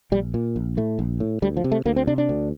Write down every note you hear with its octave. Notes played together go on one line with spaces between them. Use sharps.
A#1 G3
A#2
A#1
A2 A3
A#1
A2
D2 G3
F3
C3
A3
D2 A#3
C4
C3 D4
D4
D2